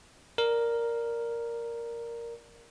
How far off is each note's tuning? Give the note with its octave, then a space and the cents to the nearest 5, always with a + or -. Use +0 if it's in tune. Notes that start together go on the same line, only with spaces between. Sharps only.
A#4 +0 D5 +0